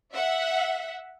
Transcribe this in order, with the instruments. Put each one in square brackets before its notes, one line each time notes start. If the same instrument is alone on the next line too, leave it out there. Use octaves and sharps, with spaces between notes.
[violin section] E5 F#5